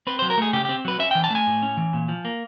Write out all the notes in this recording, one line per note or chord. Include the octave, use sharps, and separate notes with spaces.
C4 B4
F#3 C5
A#4
A3 G#4
C#3 G4
C4 G4
F#3 B4
C#4 E5
E3 G5
A5
A3 G#5
A2
C#4
E3
A#2
F3
A#3